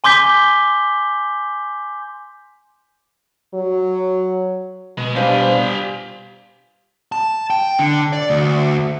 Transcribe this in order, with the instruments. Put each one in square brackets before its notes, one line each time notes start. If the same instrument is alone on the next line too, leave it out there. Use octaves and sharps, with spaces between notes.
[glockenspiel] G#5 C6 D6 G6 B6 G7
[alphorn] F#3
[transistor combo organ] B2 [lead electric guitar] G#3
[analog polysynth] G3 D4 C5 [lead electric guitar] G4 G#5 [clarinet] F5
[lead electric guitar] A5
G5
D3
D5
D2